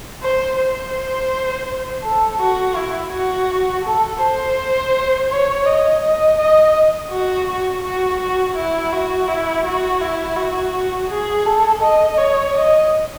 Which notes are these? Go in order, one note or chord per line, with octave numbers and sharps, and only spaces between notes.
C5
C5
A4
F#4
E4
F#4
A4
C5
C#5
D#5
D#5
D#5
F#4
F#4
F#4
F#4
E4
F#4
E4
F#4
E4
F#4
G#4
A4
D#5
C#5
D#5